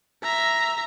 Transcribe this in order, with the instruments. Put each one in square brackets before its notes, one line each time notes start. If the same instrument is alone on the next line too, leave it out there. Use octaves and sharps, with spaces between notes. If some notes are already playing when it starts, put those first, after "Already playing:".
[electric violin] E5 A#5